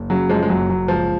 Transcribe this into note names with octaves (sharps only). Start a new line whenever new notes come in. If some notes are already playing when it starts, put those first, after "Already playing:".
Already playing: F#1
C#3 F#3
F#2 F3 G#3
G#3
F#1 F#3
F#1 F#3
C#2 F3